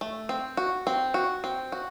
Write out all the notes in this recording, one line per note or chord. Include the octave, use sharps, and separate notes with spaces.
A3
C4
F#4
C4
F#4
C4
F#4